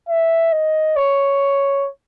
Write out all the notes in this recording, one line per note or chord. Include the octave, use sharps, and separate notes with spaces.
E5
D#5
C#5